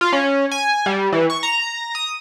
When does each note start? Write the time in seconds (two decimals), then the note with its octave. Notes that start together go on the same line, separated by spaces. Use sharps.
0.01 F4
0.13 C#4
0.51 G#5
0.86 G3
1.13 E3
1.30 C#6
1.43 A#5
1.95 D#6